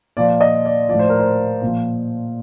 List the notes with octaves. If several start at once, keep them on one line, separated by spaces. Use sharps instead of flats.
A#2 F3 D5
D#5
D5
A2 F3 D5
C5
A#4
C5
A#2 F3